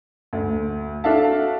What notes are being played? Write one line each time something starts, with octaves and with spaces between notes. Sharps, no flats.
D2
D4 F#4 A4 E5 F5 A5